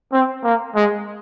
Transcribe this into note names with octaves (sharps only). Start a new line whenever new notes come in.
C4
A#3
G#3